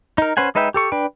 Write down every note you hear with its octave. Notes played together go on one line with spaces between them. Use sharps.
D#4 A#4
C#4 B4 C5 F#5 G#5
G#3 D#4 B4 E5 G5
G4 A4 C#6
D4 B4 G5